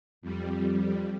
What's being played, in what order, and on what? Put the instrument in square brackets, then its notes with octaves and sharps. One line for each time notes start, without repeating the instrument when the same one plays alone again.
[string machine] F2 G3